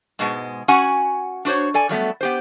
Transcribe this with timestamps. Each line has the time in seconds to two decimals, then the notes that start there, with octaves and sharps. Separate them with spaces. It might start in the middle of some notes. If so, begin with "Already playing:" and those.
0.19 G#2 B2 G#3
0.68 C#4 F#4 F#5 G#5
1.45 D4 F#4 C5 C#5
1.74 A4 D5 G#5
1.89 F#3 G3 A3 B3
2.21 B3 G4 C5